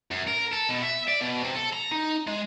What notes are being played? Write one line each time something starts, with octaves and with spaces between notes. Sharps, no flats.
F#2
A#4
A4
B2
E5
D5
B2
C3
A4
A#5
D#4
G#3